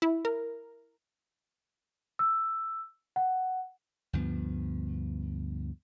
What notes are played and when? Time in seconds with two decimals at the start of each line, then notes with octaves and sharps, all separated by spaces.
0.02 E4
0.25 A#4
2.19 E6
3.16 F#5
4.13 D2 G2 F3 B3